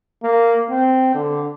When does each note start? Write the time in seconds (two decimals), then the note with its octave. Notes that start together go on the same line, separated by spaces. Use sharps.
0.23 A#3
0.70 C4
1.14 D3